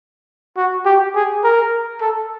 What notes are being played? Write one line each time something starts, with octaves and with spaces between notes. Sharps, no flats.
F#4
G4
G#4
A#4
A4